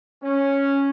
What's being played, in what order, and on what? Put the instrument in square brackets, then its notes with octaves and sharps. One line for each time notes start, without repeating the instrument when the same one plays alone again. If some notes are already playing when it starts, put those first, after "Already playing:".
[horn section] C#4